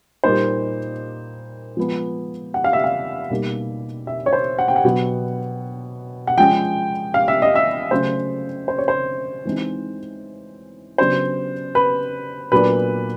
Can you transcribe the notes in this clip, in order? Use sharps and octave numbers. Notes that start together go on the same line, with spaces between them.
A#2 G3 A#3 D#4 C5
F3 G#3 B3
F#5
F5
E5
F5
B2 G3 A#3 D#4
E5
C#5
C5
F#5
G5
F#5
B2 F#3 B3
F#5
F3 G#3 C#4 G5
F5
E5
D#5
E5
C#3 F#3 A3 C5
C5
C#5
C5
E3 G#3 C4 D#4
C#3 F#3 B3 D4 C5
B4
A#2 F#3 B3 D4 B4